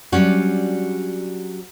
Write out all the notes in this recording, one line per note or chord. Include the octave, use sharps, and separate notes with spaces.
F#3 G3 C#4 D4 F#4